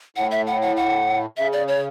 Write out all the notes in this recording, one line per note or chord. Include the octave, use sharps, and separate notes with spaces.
A2 F#5
E5
F#5
F#5
F#5
C#3 E5
D5
C#5